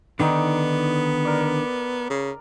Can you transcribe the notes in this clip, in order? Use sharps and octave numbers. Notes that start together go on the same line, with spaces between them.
D3 D#3 B3 D#4 D5
A#4 D5
C#3